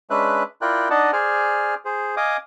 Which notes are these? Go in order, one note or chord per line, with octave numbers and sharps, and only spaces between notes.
G#3 C#4 D4 B4 E5 F#6
E4 F4 A#4 D5 G5 F#6
D4 D#4 D5 D#5 F#5 A5
G#4 C5 D5 G#5 F6
G#4 C5
D#5 F5 G#5 D6 D#6